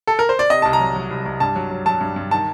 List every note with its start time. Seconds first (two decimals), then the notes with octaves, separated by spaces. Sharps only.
0.07 A4
0.19 A#4
0.29 C5
0.39 D5
0.50 C3 D#5
0.62 C2 A5
0.73 A#5
0.80 F#3
0.95 F#3
1.11 C2
1.26 C2
1.40 G2 A5
1.56 F#3
1.71 F#3
1.86 F#3 A5
2.01 G2
2.16 G2
2.31 D#3 A5